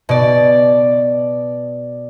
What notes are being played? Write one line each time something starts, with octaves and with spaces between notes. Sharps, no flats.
B2 D5